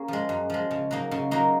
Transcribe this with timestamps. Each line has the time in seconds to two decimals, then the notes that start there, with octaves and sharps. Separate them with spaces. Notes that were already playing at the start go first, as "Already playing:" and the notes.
Already playing: A#3 C#4 G#4
0.08 F3 G#3
0.29 F#2
0.50 F3 G#3
0.71 C#3
0.91 F#3 A#3 D#4
1.11 C#3
1.31 F#3 A#3 D#4